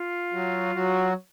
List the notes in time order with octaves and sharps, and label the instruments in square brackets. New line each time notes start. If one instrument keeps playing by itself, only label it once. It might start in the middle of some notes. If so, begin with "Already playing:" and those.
Already playing: [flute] F4
[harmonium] F#3 F#4
F#3 F#4